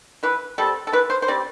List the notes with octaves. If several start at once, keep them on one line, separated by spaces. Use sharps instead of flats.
E3 B4
G3 C4 A4
A4
E3 B4
C5
C5
G3 C4 D5